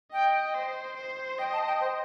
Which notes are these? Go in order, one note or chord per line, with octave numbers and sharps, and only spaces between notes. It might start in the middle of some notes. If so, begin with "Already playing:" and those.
D#5 G5
C5
C5
D#5 G5
A5
G5
C5